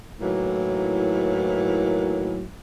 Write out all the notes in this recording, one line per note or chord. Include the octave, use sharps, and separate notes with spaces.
A2 D#3 E3 F#3 A#3